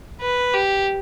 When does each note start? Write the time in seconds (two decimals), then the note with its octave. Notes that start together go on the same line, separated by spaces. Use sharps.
0.21 B4
0.54 G4